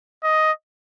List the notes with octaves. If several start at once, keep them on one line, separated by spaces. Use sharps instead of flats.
D#5